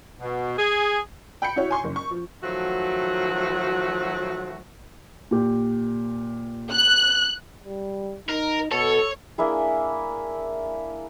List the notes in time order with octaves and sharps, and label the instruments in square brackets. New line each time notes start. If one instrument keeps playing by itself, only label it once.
[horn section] B2
G#4
[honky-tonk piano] G5 B5 G6 C#7
E4 F#4 C#5
G#5 C6 C#6
F#1
C#6
F3
[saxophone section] D#3 F3 F#3 A3 F#4
[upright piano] A#2 G4
[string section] F#6
[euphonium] G3
[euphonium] D#4 [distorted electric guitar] A#4
[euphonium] B2 [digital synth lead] A4 [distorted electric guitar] C#5
[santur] A#3 D4 E4 G#4